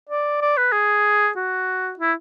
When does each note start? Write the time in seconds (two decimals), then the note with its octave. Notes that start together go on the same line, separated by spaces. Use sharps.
0.10 D5
0.41 D5
0.57 B4
0.72 G#4
1.36 F#4
1.99 E4